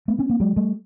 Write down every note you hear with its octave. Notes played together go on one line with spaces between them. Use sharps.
A3 B3
B3 C#4
A#3 C4
F#3 G#3
G3 A3